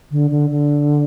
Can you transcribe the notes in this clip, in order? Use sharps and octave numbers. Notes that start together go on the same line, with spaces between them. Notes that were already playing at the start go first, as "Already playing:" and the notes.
D3
D3
D3